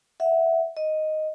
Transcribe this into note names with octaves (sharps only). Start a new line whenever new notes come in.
E5 F#5
D#5